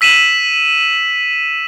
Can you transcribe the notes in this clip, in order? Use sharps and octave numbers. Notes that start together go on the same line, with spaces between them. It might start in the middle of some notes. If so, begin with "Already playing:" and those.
E6 B6 D#7 E7 F#7